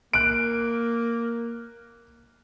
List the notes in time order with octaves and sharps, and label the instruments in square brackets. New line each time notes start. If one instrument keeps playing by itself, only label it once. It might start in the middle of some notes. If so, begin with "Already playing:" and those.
[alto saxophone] A#3 [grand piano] F#6 D7